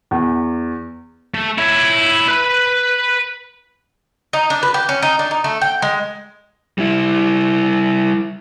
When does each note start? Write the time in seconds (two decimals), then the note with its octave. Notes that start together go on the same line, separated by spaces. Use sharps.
0.11 E2
1.34 A3
1.58 E4 C#5
2.28 B4 B5
4.33 D#4
4.50 D4
4.63 B4
4.74 G4
4.89 C#4
5.02 D#4
5.19 D4
5.31 D#4
5.44 A3
5.61 G5
5.82 G#3
6.78 G3 E4